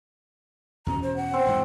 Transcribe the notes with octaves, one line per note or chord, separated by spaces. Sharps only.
E2 B2 C#4 A#5
C5
F#5
C4
E1 G#2 F#3